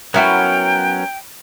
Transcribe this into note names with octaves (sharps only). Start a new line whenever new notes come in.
F#3 B3 C#4 E4 F#4 A#4 G5